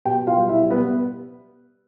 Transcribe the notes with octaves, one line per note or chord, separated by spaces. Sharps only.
B2 G4 G5
F4 F5
G3
E4 E5
G3
B3 B4